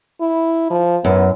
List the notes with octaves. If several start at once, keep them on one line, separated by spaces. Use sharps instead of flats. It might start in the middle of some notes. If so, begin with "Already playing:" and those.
E4
F3
F#2 B3